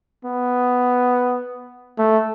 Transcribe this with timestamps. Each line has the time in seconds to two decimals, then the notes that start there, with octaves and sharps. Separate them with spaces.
0.25 B3
1.98 A3